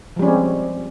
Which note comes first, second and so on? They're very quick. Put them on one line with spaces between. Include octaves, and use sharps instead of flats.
F3 G3 C#4 G#3 C4